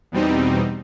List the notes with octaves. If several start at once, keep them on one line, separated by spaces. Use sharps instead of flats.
E2 B2 G3 C4 D#4